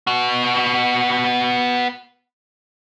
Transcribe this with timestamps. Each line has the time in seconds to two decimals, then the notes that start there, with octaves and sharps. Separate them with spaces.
0.07 B3 F#4